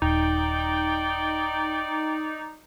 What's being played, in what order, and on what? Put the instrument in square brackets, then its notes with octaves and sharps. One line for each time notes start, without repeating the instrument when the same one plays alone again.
[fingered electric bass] D#1 [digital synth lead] D#4 [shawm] D5 [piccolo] G5